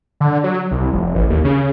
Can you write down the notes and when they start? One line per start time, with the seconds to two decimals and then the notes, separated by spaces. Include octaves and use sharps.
0.20 D3
0.44 F#3
0.71 C2
0.93 F1
1.15 A1
1.30 D#2
1.44 C#3